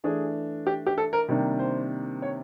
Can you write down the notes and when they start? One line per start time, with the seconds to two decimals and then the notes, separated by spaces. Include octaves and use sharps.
0.04 E3 A3 D4 G#4
0.67 G4
0.86 G4
0.98 A4
1.13 A#4
1.28 C3 D#3 G3 A#3 D4
1.59 C5
2.22 C#5